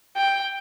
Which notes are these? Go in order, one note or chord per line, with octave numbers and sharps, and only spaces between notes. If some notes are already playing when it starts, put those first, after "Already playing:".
G5